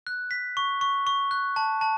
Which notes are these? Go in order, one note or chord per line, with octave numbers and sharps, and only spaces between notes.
F#6
B6
C#6
C#6
C#6
F#6
A5
A5